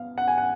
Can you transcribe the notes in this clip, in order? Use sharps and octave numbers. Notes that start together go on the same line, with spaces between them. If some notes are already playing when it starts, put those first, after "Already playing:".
Already playing: B3 F5
F#5
G#5
F#5